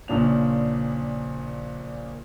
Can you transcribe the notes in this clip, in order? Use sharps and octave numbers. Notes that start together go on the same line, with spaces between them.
A#1 A#2 C#3 D4 F7